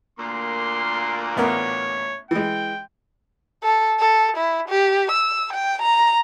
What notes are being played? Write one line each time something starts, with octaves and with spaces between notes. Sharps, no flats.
D2 A#2 A#3 C6
A1 B3 A#4 C#5
E3 G#3 G5
A4
A4
E4
G4
E6
G5
A#5